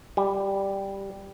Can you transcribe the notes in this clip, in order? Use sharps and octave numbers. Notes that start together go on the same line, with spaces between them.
G3